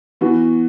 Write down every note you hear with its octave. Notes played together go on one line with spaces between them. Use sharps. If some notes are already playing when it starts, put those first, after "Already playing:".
E3 B3 F#4